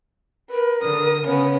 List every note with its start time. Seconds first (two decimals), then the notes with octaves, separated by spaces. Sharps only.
0.50 A#4 B4
0.83 D3 D#6
1.25 C#3 B3 C#4